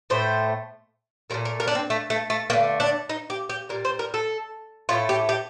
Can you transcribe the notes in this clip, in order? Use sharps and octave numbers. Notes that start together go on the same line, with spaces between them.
A2 A3 C5
A#2 F3 A3 A#4
A#4
A#4
D4
C4
A3
A3
A3
D3 A3 A#3
D4
D#4
G4
G4
A#2 G3 A#4
C5
A#4
A4
A2 A3 F4
G4
G4